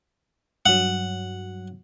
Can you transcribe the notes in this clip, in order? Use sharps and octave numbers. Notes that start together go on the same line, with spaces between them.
G2 F#3 F#5